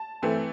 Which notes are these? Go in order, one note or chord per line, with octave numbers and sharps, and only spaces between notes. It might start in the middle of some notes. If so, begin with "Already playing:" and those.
Already playing: A5
E3 A3 C4